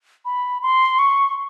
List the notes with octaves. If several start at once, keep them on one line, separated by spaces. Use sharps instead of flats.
B5
C6
C#6